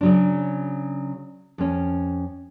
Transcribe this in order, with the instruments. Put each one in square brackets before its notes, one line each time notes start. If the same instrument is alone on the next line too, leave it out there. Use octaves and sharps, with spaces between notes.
[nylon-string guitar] C#3 F#3 D4
F2 C#4